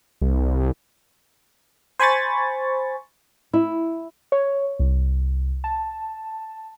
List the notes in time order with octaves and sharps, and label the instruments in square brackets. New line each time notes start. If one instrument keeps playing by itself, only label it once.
[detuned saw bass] C2
[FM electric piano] C5 G#5 B5 C#6 A6
[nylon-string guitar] E4
[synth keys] C#5
C2
A5